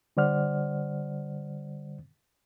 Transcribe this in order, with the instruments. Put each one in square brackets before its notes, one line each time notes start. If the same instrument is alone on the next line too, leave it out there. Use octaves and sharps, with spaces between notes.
[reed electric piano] D3 G3 C5 D5 F#5 F6